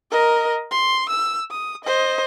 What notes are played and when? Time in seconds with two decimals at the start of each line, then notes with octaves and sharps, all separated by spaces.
0.11 A#4 D#5
0.71 C6
1.09 E6
1.51 D#6
1.84 C5 D#5